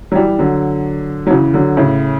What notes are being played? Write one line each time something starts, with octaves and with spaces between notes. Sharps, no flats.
F#3
E3 G3
D3 F#3
F#3
C#3 E3
D3 F#3
A2 C#3